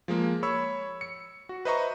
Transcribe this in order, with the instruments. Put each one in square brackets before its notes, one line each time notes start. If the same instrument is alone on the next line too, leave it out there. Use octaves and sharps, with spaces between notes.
[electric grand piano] F3 G#3 A#3
C#5 B5 C#6 E6
C#7
F#4
B4 C5 D#5 E5 A#5 C#6